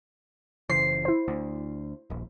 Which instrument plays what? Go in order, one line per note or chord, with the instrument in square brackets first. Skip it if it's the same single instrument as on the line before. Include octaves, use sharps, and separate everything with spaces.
[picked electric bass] F#1 C#3 E3 [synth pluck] C5 [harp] C7
[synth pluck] E4 C5
[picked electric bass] D2
D#1 A#1